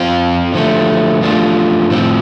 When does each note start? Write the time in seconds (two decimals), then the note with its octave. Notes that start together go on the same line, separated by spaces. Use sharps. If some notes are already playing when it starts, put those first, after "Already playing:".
Already playing: F3 C4 F4
0.54 D3 F3 A3
1.21 F3 A3 D4 F4
1.90 A2 F3 C4